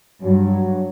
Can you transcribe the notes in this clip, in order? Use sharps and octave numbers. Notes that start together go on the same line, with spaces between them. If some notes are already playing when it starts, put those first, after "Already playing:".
G2 F#3